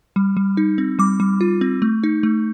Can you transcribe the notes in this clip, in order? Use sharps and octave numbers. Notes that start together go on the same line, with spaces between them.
G3
G3
D#4
C4
G3 D6
G3
F4
C4
A3
D#4
A3